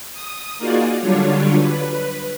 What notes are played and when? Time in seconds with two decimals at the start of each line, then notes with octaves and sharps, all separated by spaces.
0.13 D#6
0.59 A#3 D#4 F4 F#4 G#4 D5
0.99 D3 F#3 G3 D4 F4 C#5
1.54 B4